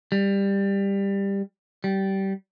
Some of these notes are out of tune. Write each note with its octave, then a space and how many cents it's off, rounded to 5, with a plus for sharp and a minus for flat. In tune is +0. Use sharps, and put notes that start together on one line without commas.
G3 +15
G3 -20